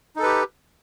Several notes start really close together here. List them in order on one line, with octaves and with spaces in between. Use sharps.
D#4 A4 B4 G4